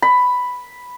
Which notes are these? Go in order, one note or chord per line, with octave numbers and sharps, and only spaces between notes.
B5